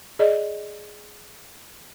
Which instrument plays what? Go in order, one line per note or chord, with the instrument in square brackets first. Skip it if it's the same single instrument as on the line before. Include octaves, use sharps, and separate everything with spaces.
[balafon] G#4 D5 D#5